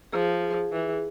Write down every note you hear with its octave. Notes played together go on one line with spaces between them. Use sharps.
F3 G#4
E3